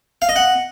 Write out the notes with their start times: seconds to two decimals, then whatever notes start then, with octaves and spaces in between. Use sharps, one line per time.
0.22 F5
0.29 D#5
0.36 F#5